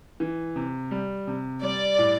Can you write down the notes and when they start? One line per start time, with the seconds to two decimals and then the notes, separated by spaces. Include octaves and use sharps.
0.20 E3
0.56 C3
0.91 G3
1.27 C3
1.62 G3 D5
1.98 A2